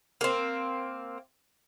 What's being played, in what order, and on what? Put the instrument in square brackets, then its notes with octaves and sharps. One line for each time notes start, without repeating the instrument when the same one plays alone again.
[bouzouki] A#3 C4